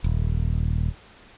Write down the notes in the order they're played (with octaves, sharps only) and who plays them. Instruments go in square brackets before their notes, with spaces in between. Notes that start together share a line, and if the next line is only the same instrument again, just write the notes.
[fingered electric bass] D#1